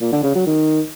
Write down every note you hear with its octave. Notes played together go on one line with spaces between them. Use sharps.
A#2
D3
C#3
F#3
D#3